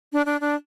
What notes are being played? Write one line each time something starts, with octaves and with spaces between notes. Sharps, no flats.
D4
D4
D4